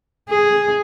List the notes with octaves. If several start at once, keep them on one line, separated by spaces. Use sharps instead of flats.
G#4